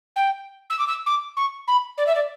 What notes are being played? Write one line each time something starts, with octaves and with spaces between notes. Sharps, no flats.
G5
E6
D6
E6
D6
C#6
B5
D5
E5
D5